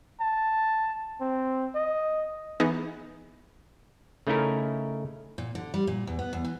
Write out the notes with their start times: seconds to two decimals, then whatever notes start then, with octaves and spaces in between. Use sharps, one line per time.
0.20 A5
1.21 C4
1.75 D#5
2.60 E3 B3 D#4 G#4 D#5
4.27 C#3 A3 C#4 D#4 E4 A#4
5.38 A#2
5.55 D3
5.74 G3
5.87 A#2
6.07 E2
6.19 B3
6.33 E2
6.44 E3